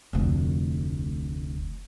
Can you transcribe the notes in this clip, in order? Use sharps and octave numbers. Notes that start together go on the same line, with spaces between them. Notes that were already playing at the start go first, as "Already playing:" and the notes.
F1 D2